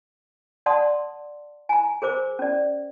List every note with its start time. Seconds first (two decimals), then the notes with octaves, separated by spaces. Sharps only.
0.66 D5 F#5 A5 C6 D#6
1.69 G#5 A#5
2.02 G#4 A#4 C5 D6
2.39 C#4 D5